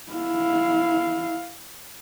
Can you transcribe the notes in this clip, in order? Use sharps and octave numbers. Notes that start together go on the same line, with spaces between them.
E4 F5